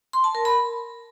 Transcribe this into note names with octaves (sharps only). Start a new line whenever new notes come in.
C6
A5
A#4
B5